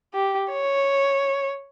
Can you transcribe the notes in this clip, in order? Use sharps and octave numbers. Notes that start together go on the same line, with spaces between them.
G4
C#5